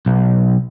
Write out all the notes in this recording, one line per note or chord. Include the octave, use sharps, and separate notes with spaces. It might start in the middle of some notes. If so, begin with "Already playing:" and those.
B1